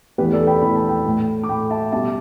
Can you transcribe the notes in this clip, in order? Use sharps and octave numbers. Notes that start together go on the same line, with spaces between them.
E2 E3 A3 G4 B4
A4 D5
G5 B5
E2 E3 A3 B5
A5
G5 B5
A2 A3
D6
A2 A3 G5 B5
E5 A5
B2 G3 E5 A5